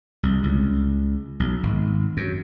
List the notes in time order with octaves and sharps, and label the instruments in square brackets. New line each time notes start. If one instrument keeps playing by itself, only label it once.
[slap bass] C2
C#2
B1
G#1
F#2